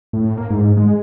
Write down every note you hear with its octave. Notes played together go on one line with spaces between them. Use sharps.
A2
A#3
G#2
G#3